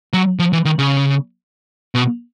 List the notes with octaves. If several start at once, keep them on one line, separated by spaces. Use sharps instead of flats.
F#3
F3
E3
D#3
C#3
B2